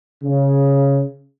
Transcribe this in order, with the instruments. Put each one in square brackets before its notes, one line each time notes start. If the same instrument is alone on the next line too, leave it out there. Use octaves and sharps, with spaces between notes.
[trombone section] C#3